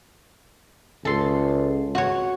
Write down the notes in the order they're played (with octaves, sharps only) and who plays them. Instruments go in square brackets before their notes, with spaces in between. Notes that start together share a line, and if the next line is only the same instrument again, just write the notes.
[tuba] C#2 [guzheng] A4 C6
[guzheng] F#4 C#5